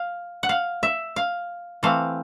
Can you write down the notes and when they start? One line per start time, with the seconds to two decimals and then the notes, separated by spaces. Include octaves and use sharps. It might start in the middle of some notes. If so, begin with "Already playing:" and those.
Already playing: F5
0.43 F#5
0.49 F5
0.83 E5
1.16 F5
1.83 E3 A3 C4 F5